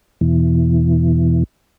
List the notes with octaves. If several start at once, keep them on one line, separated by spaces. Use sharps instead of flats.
E2 B2 E3